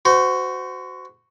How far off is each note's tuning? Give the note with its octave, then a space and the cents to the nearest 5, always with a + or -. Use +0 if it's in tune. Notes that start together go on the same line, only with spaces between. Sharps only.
F#4 +0 C5 -30